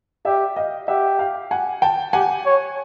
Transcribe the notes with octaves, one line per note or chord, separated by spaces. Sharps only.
G4 D5 E5
D#5 F5
G4 E5 F#5
F5 G5
F#5 G#5
G5 A5
G4 F#5 G#5
C#5